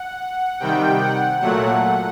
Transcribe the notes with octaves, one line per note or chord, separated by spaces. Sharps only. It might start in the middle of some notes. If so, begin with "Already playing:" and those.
Already playing: F#5
C3 D#3 G3 G5
F#5
A#2 F#3 A3 F#5